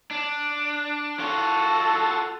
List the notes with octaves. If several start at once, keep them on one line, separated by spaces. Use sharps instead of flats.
D4
F4 F#4 A4